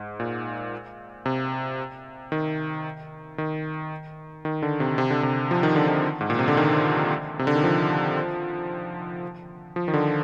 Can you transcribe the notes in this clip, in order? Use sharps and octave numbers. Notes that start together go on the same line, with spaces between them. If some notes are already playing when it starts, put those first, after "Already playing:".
Already playing: G#2
A#2
C3
D#3
D#3
D#3
D3
C3
C3
D3
C3
F3
D#3
D3
D#3
G#2
A#2
C3
D3
D#3
C3
D3
D#3
F3
F3
D#3
D3